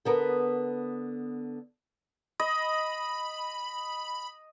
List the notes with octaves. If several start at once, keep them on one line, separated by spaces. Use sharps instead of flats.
D3 B3 A#4
D#5 B5